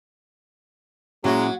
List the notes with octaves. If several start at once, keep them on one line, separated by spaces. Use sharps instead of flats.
A#2 F#3 G#3 C#4 E4 F#4 A#5